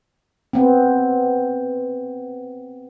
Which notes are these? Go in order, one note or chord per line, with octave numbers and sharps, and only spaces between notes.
B3 C4